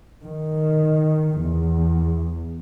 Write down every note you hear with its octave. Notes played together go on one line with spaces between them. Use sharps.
D#3
E2